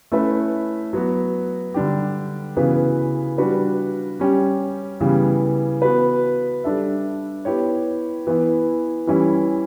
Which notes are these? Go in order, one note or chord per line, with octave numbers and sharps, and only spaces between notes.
A3 C#4 E4 B4 E5
F#3 B3 F#4
D3 G3 D4 G4
C#3 E3 B3 F#4 B4
G3 D4 F#4 B4
G3 C#4 G4
C#3 E3 G3 B3
B3 F#4 B4
G3 D4 A4 E5
B3 E4 G4 C#5
E3 B3 E4
E3 G3 C#4 E4